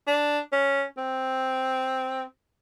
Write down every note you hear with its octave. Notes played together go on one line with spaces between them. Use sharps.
D4
C#4
C4